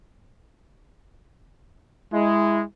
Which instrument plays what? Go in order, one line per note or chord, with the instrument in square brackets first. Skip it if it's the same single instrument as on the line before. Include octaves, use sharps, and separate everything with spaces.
[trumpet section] G#3 [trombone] E4